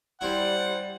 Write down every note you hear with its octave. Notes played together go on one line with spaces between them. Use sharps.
G3 C4 E4 F#5